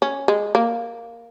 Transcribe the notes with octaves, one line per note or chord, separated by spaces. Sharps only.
C#4
G#3
A#3